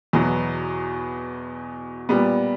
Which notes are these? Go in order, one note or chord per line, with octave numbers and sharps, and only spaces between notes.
E2 B2 F#3 B3 E4
A#2 G3 B3